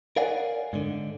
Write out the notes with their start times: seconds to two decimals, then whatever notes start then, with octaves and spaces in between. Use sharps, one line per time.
0.16 A#4 C#5 D5 F5 F#5 G#5
0.73 G#2 D3